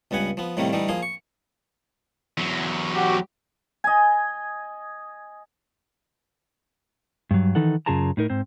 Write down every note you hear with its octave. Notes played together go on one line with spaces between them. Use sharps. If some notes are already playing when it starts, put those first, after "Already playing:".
C#2 G2 B3 F#5 G#5
F3 B3
A2 C3 D#3 G3 A3 A#3
D3 E3 G3 A3 D#4
F3 A#3 G#4 C6
C#6
E2 F#3
F#4 G4
D#5 G#5
G2 F#3
D#3 E3 D#4 A4 F#5
F#2 C#3 F4 G#4 A5 A#5
A2 D#4 A#4
G#2 C4 C5